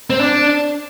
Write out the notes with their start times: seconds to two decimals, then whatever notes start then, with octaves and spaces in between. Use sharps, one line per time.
0.10 C4
0.19 D4